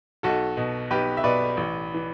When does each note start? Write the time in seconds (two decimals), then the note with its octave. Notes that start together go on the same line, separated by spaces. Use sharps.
0.23 B1 F#4 A4
0.57 B2
0.90 B1 G4 B4
1.17 E5
1.24 B2 B4 D5
1.57 A1
1.94 E3